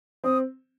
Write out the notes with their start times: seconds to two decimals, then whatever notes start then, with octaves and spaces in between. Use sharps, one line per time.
0.24 C4 D#6